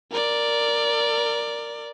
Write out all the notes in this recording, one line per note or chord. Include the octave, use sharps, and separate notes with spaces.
A#4 D5